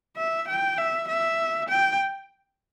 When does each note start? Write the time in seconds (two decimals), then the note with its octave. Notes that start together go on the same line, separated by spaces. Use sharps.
0.17 E5
0.48 G5
0.78 E5
1.08 E5
1.69 G5